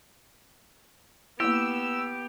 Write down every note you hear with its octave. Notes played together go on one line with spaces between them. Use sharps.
A#3 B3 E4 G4 E6